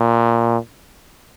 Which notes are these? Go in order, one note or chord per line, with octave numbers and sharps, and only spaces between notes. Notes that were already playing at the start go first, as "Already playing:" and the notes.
Already playing: A#2